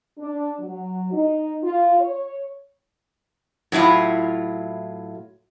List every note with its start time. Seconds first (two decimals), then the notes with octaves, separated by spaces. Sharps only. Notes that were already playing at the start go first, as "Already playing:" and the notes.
0.18 D4
0.60 F#3
1.12 D#4
1.63 F4
2.00 C#5
3.72 A2 F#3 E4 F4